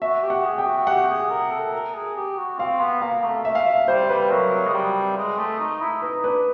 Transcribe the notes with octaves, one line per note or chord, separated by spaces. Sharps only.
F#4 E5
G4
F#5
G#4
G5
F#4
G4 F#5
G#4
A#4
A4
A#4
G#4
G4
F#4
C4 F5
B3
A#3 F5
A3
E5
F5
E5
G3 C5
G3 B4
F#3 A#4
G#3
G3
G#3
A3
D#4
E4
D#4 B4
D4 B4